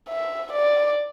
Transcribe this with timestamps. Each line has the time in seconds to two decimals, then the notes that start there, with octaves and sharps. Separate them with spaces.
0.09 E5
0.52 D5